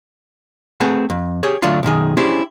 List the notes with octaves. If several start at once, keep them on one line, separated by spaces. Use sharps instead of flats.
A3 C4 G#4 B4 F#5
F2
G4 G#4 C#5
D2 F#3 A3 D4 F4 C6
B1 F#2 D#3 G#4
C#4 D4 E4 G4 G#4 C5